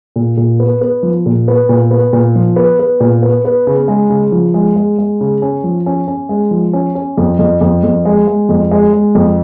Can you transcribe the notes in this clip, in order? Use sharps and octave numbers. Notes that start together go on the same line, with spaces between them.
A#2
A#2
B3
B3
F3
A#2
B3
A#2
B3
A#2
F3
B3
B3
A#2
B3
B3
C#3
G#3
C#3
F3
G#3
G#3
G#3
C#3
C#4
F3
C#4
C#4
G#3
F3
C#4
C#4
F2
F2
F2
F2
G#3
G#3
F2
G#3
G#3
F2